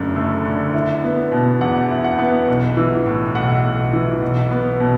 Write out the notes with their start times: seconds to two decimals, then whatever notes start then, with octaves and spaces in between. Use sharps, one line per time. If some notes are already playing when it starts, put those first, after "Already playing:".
Already playing: F#1 F#2 D3 A3
0.16 A3
0.45 D3
0.74 E4
1.03 B3
1.32 B2
1.61 E2 F#5
1.90 E4
2.04 F#5
2.19 B3
2.48 B1
2.77 E3
3.06 A2
3.35 B1 F#5
3.64 B1
3.93 E3
4.22 B1
4.51 B3
4.80 B2